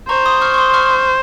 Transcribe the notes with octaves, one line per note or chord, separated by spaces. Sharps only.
C5 A#5 C#6
C6 D#6
C#6 F6
C#6
C6 D#6
C#6 F6